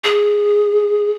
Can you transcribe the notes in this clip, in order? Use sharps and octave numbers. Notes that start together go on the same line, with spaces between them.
G#4